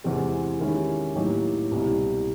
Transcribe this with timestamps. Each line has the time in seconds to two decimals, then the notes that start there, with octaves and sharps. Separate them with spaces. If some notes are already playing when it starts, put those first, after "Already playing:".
0.04 E2 C3 E3 G#3 C4
0.59 D#3 G#3 C#4 E4 G4
1.15 A2 F#3 A#3 D#4 G4
1.71 C2 B2 G3 C4